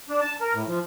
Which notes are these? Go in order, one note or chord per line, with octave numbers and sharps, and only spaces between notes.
D4
A5
A#4
A2
F3